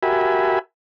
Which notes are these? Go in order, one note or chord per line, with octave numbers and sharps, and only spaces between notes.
F#4 G4 A#4 E5 G#5 B5